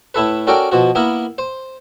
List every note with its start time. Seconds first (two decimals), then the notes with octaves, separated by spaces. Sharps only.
0.14 A2 E4 A4 B4
0.47 C#4 F#4 A4 A#4 D5 G5
0.72 B2 F3 F#4
0.95 A#3 B3 E4 A#4
1.38 C5